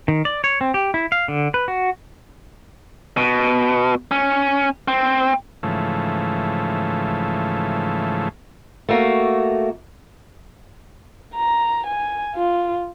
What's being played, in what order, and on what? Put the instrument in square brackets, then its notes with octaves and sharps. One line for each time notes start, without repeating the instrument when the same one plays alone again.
[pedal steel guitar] D#3
D5
C#5
C4
G4
E4
F5
D3
B4
F#4
[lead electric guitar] B2
C#4
C4
[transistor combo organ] G#2 C#3 E3 F3 A3
[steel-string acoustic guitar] A3 A#3 F#4
[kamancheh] A#5
G#5
F4